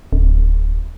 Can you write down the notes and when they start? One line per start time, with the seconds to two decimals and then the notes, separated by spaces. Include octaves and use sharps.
0.13 D1